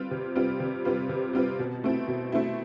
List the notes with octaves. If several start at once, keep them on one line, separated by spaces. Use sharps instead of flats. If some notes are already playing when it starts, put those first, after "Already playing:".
Already playing: G3 C4 F4 B4
C3
G3 C4 F4 B4
C3
G3 C4 F4 B4
C3
G3 C4 F4 B4
B2
A3 C4 E4
B2
A3 C4 E4